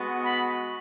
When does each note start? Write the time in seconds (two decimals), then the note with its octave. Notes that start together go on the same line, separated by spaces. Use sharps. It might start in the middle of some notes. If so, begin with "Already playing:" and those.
Already playing: G#3 B3 F#4
0.24 B5